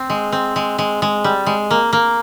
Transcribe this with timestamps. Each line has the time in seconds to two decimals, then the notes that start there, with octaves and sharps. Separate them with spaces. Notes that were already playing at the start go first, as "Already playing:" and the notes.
Already playing: C4
0.10 G#3
0.32 C4
0.56 G#3
0.78 G#3
1.02 G#3
1.24 G3
1.46 G#3
1.71 A#3
1.93 A#3